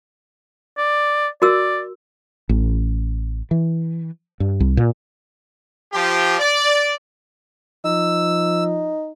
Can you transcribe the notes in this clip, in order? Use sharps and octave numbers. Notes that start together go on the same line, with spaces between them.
D5
F#4 A#4 D5 E6
A1
E3
G2
C2
A#2
F3 G4
D5
F3 D#4 E6